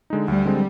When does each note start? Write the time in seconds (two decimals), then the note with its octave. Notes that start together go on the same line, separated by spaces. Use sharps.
0.10 D3 G#3 D#4
0.28 D2 G3
0.45 D3 G#3 C4